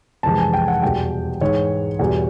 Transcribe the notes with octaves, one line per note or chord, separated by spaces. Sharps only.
F2 C3 E3 G#3 A5
G#5
G5
F#5
E2 B2 G3 G5
G#2 E3 G#3 C#5
E2 B2 G3